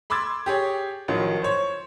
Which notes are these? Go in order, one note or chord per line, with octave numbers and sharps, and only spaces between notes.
B5 C6 D6 E6 G#6 A6
G4 G#4 C#5
A1 D#3 F3 F#3
C5 C#5